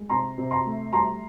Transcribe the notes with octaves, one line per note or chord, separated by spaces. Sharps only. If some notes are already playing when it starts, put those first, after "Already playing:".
Already playing: G#3
C3 A#5 C6
C3
A#5 C6
A3
G3 A#5 C6